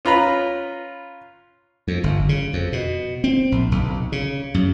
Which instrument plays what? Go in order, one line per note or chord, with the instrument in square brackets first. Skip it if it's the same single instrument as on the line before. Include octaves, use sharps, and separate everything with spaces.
[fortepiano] C#4 F4 B4 A#5 B5
[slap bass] F2
G1
C#3
F2
B2
C4
A#1
B1
C#3
F#2